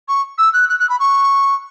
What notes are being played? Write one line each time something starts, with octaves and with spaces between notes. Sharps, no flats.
C#6
E6
F#6
F#6
F#6
B5
C#6